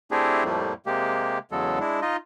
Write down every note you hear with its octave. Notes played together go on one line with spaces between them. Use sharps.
A3 C4 D4 E4 G4 G#4
F2 A2 F3 G3 A3 A#3
C3 G#3 A#3 G4
E2 C#3 F#3 G#3 A4
G#3 D4 E4
D#4 F4 D#5